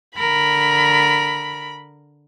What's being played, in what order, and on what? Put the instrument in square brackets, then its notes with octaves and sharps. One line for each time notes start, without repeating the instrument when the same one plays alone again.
[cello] D3 A#4 [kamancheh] B5